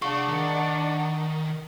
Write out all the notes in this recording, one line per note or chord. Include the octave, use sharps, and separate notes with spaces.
D4 G#4 F5 F#5 C#6
D#3